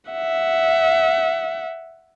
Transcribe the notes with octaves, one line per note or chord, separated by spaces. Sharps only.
E5 F#5